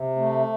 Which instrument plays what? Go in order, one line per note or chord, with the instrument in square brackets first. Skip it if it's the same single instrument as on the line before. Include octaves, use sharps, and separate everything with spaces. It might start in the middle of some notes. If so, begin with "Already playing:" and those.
Already playing: [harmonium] C3
A3